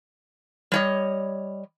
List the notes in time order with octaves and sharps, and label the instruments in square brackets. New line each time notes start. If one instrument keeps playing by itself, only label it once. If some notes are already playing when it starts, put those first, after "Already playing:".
[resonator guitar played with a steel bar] G3 C#5 D#5